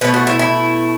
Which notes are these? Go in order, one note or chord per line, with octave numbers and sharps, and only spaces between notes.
B2 A3 B4
F#4
E4
E4